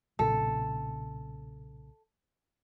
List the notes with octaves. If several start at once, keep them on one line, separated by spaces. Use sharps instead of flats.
B1 A#2 C#3 A4